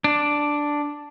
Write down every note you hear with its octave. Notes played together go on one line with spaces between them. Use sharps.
D4